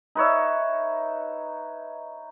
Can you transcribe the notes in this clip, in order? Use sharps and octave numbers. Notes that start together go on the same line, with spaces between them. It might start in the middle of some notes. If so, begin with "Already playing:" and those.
D#4 B4 C#5 E5